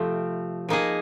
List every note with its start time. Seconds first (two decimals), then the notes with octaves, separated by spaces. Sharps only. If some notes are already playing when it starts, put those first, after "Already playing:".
Already playing: C3 F3 A3 C4
0.69 F3 A#3 D#4 G#4